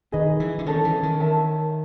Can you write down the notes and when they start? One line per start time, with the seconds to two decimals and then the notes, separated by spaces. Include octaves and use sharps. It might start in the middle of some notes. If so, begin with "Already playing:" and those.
0.12 D#3 G#4 B4 D#5
0.40 E3
0.59 D3
0.66 D#3 C#4 F#4 A4 C#5
0.84 E3
1.03 D#3
1.20 A#4 C#5 E5 A5